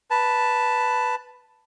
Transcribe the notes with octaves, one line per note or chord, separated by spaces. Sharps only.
B4 A5